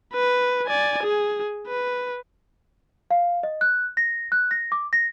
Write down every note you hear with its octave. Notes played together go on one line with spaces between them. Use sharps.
B4
D5 G#5
G#4
B4
F5
D#5
F#6
A#6
F#6
A#6
D6
A#6